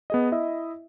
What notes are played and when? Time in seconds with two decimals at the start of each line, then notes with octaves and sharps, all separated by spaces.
0.10 B3 G#4 D#5
0.32 E4 D#5 E5